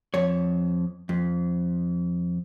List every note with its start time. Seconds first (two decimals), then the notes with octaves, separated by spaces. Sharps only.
0.14 F2 C#5
1.09 F2